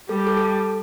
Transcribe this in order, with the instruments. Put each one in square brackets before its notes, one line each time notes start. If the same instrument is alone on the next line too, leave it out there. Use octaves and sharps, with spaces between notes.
[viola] G3 [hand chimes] A4
[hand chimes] A4
A4